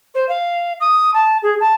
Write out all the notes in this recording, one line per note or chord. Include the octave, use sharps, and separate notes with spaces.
C5
F5
D#6
A5
G#4
A5